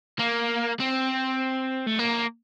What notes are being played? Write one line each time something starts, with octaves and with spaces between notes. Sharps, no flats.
A#3
C4
A3
A#3